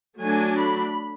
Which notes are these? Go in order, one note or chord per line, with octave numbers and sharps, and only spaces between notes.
F#3 A3 D4 G#5
B5